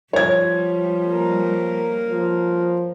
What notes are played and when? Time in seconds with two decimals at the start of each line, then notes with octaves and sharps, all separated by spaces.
0.13 F3 G3 C#5 G#6
1.06 A#3 A#4
2.09 F3